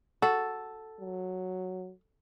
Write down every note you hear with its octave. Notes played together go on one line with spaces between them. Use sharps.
F#4 A4
F#3